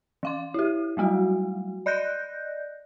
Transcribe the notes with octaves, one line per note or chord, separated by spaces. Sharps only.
E3 F5 C6
E4 G4
F#3 G3 A3 F#4
D5 D#5 F#6 G6 A#6